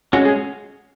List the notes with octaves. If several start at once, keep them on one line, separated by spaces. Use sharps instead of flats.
G#3 C#4 F#4
G#4